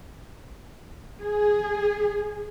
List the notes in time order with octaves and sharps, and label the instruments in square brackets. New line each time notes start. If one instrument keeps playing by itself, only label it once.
[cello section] G#4